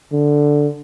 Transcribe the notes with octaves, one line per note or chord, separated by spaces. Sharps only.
D3